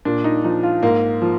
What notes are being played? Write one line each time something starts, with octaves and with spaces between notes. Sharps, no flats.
A#2 D4
D#4
F3 D#4
F4
G#2 A#3
F3